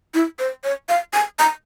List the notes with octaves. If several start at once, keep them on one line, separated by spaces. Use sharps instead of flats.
E4
C5
C#5
F5
G#5
A#5